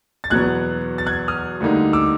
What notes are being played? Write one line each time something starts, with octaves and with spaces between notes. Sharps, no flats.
A6
E2 B2 F#3 B3 F#6 G#6
A6
F#6 G#6
D#6 F6
D2 D3 G3 A#3 D#4
D6 E6